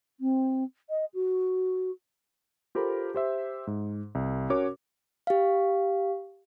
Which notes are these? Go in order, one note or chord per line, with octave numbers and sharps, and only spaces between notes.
C4
D#5
F#4
F4 G4 A4 A#4 C5 B5
G4 C5 E5
G#2
C2
C#4 F#4 A#4 C#5 D6
G4 F5